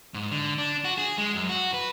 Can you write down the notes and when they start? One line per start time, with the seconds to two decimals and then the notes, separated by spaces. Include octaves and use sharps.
0.14 G#2
0.31 D3
0.58 D4
0.85 F#4
0.98 G#4
1.18 G#3
1.35 F#2
1.49 F#4
1.74 B4